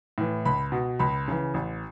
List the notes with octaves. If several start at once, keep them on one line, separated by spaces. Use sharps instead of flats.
A2 E3
C#2 B5
B2
C#2 B5
C#3 E3
A1